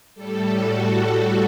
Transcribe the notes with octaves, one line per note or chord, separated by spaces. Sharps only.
A2 G3 A4
F#4
F#4